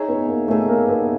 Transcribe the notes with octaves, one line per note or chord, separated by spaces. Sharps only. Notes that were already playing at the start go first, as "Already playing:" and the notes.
Already playing: D#4 G#4 C#5 E5
B3
A#3
A3 D#4 G#4 C#5 E5
A#3
B3